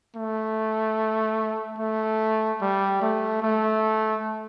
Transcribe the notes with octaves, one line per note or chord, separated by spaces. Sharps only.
A3
A3
G3
A3
A3